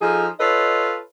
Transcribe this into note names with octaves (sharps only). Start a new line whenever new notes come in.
F3 D#4 F4 G#4 A4
F4 A4 B4 C#5 D#5